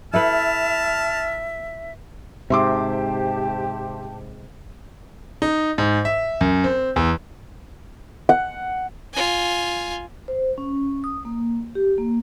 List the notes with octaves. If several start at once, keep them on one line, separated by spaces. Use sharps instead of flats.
E4 A4 B4 E5 A5 F6
G#2 C3 G4 E5 A5 C6 D6
D#4
G#2
E5
F#2
C4
E2
F#5
F4 G#5
C5
C#4
D#6
A#3
G4
A#3